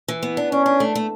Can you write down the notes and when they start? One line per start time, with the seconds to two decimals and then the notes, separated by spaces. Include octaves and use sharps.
0.08 E3
0.23 B3
0.37 D4
0.52 C#4 D4
0.66 D4
0.80 A3
0.95 A3